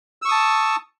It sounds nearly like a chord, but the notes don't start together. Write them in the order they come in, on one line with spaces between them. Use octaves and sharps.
E6 C#6 D#6 A5